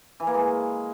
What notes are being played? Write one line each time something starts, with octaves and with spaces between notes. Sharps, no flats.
E3
A#3
G#3